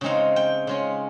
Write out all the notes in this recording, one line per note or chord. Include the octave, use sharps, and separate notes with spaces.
C#3 G#3 C4 D#4 F5
G5
C#3 G#3 C#4 F4